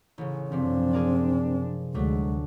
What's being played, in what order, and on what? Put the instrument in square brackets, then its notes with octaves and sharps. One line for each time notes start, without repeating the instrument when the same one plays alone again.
[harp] A1 C#3
[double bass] F#2 D4 [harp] C3 F3 [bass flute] C4
[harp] G#4 A#4 D5
[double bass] D2 [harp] F#3 A3 D4 [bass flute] G#3